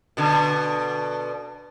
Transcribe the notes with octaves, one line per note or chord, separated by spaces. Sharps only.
B2 D3